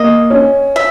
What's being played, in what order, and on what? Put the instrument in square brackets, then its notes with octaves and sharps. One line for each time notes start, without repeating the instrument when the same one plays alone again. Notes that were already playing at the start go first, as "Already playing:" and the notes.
Already playing: [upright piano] A#3 [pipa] D#5
[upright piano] C#4
[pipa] E5